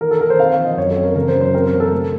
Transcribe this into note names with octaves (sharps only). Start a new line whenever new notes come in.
D#3 A#4
A4
D#3 A#4
C5
C4 F5
F5
F3
D#5
F#2 C#5
A4
C4
A#4
C#3 A#4
C5
F#2
C5
C4 A#4
A#4
C#3
A4
A3